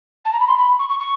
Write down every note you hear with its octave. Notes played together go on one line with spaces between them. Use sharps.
A5
A#5
B5
C6
B5
C#6
C#6
C#6